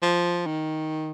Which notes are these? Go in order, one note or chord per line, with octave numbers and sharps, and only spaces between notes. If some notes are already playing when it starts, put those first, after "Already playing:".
F3
D#3